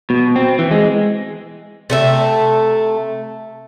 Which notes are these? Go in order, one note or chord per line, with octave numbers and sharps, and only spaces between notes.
B2
C4
E3
G#3
C3 A3 E5